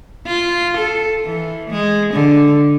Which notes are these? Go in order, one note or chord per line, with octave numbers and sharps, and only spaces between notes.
F4
A4
E3
G#3
D3